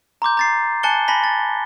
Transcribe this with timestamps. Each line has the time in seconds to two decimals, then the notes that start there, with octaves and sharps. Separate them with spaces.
0.22 A#5 C6 D6 G6
0.37 A#5 A6 C7
0.83 G#5 A5 F#6 A6 C#7 G7
1.08 G#5 A5 B5 A#6 B6 G7
1.24 A6